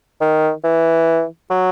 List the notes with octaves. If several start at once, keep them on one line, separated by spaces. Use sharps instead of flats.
D#3
E3
F#3